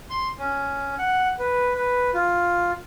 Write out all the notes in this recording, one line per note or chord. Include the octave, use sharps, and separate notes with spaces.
C6
C#4
F#5
B4
B4
F4